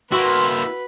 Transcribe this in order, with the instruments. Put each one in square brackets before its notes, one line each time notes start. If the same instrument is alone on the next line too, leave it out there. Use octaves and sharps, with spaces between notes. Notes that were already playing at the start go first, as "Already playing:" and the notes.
[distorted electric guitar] A#3 E4 [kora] F#4 [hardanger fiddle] B4 [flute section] C6